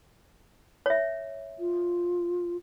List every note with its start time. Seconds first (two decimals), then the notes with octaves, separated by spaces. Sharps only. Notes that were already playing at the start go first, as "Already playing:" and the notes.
0.86 C#5 E5
1.59 F4